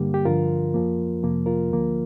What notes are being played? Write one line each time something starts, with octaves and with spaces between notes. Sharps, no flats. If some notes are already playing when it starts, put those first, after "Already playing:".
Already playing: G2 D3 G3 A#3 G4
G4
G2 D3 F3 F4 A#4
F2 F3 A#3
F2 C3 F3 A#3
F4 A#4
D2 D3 F3 A#3